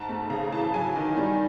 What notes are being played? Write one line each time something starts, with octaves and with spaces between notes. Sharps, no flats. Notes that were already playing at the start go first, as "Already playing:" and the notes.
Already playing: G#2 A5
A3
C#3 A#5
E3 A5
F#3 G#5
D#3
G3